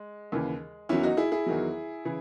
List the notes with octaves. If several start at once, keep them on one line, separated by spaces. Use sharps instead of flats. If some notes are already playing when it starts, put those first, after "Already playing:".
Already playing: G#3
D#2 C#3 E3
E2 D#3 F#3 C#4 E4
D#4 F#4
E4 G#4
E4 G#4
E2 D#3 F#3
C#3 E3